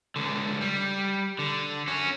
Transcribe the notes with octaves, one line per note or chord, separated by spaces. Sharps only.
C#2 D3
G3
D3
C#4 F#4